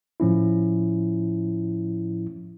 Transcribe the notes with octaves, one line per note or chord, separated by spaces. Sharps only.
A2 F3 C#4 E4